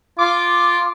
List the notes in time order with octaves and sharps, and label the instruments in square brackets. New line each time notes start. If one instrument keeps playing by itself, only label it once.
[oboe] F4 [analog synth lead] D6